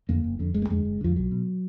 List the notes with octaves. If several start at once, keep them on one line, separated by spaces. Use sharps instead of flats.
F2 D3 A#3
F#1
F2 D3
F#1 G#3
A#3
F2 D3 G#3
F#1
F2 D3 F3
B1 F#3
B2